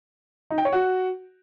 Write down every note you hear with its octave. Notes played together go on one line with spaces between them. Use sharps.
D#4
G5
C#5
F#4